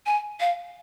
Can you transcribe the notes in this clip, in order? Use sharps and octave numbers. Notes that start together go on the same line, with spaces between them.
G#5
F5